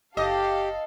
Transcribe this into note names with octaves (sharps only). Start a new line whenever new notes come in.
F#1 G4 A4 D#5 F5